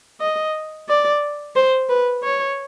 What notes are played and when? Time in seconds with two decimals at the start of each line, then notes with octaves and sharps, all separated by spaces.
0.21 D#5
0.88 D5
1.56 C5
1.89 B4
2.23 C#5